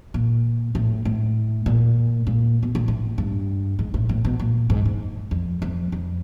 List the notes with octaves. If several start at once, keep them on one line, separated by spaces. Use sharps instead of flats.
A#2
A2
A2
A#2
A#2
B2
A#2
A2
G2
G#2
A2
A2
B2
A#2
G#2
G#2
F2
F2
F2